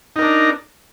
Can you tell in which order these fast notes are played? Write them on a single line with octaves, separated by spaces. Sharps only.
D#4 A#4 D4